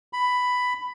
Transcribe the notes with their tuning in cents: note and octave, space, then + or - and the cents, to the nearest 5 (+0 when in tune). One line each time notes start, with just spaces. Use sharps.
B5 +10